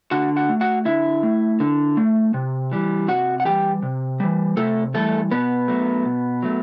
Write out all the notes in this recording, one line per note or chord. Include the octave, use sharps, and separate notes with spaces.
D3 F#4 F#5
F#4 F#5
A3
F#4 F#5
D3 E4 E5
A3
D3
A3
C3
E3 G3
C3 F#4 F#5
F#5
E3 G3 G4 G5
C3
E3 G3
C3 A3 A4
E3 G3 A3 A4
B2 B3 B4
F#3 A3
B2
F#3 A3